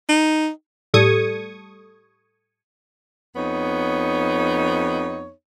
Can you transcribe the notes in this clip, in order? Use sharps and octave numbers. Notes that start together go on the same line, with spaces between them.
D#4
A2 G3 A4 C#6 D#6 G#6
F2 B3 D#4 C#5